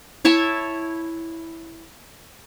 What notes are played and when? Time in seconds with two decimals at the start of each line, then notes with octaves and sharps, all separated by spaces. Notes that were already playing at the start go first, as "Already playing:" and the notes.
0.25 E4 C#5 E5 A5